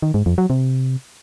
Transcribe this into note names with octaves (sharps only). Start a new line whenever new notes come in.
D#3
G#2
F2
F#3
C3